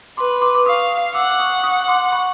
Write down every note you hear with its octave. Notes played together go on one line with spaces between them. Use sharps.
B4 C6 D6
C6 D6
D6
F5 C#6 D#6
F#5 D6 E6
D6
C#6 D#6
C#6 D#6
C6 D6
B5 C#6